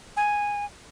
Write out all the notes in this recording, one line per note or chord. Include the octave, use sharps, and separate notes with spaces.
G#5